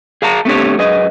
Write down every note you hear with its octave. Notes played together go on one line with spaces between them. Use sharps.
G#4 F5 A5 A#5
A3 B3 C4 D4 G4 C#5
F#2 G#4 B4 D#5